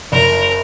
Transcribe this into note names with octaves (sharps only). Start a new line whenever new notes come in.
F#1 A#4